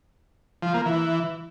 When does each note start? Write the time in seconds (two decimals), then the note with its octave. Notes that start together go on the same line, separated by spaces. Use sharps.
0.62 F3
0.74 A#3
0.86 E3